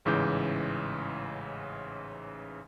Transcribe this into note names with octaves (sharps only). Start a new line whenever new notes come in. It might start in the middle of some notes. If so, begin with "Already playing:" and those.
A1 G#2 C#3 E3 D6 G6